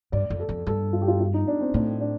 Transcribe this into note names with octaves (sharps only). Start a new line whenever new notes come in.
G2 D5
F2
A4
F2
G2 A4
F4
G4
F4
F4
D#4
D4
C4
A2 D4
D4